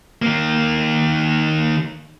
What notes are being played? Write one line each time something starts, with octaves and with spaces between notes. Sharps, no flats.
D#3 A#3